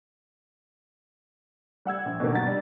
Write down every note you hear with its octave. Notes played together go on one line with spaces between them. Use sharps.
G3 F#5 E6 G#6
A#1
B2 D3 D#3 A#3
G2 B2 F#3 F#4 A6
G3